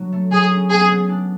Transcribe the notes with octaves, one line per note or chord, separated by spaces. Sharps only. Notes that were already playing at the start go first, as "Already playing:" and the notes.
Already playing: F#3 D4
A3
F#3 G#4
C#4
B3 G#4
B3
D4